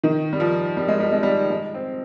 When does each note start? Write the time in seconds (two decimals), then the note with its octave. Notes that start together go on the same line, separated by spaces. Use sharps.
0.04 D#3
0.33 G3
0.40 F3
0.77 G3
0.88 G#3
1.00 G3
1.12 G#3
1.23 G3
1.50 G#3
1.74 C4